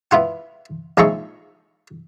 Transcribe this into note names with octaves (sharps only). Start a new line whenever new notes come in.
B3 E4 F4 F#5
A#1 F3 G#3 D#4 E5 C#6